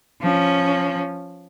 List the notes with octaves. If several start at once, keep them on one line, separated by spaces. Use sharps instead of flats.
F3 C#4